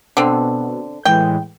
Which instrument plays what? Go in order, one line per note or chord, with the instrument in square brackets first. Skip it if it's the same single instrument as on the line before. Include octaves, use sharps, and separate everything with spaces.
[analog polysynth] B2 [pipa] D3 C4
[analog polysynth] A2 E3 G#3 [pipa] G5